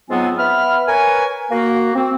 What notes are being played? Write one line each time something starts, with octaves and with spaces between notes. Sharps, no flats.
G#2 F#3 B3 C4 F4 G#5
B3 E5 B5 F6
A#4 B4 C#5 G#5
A#3 F#4
C4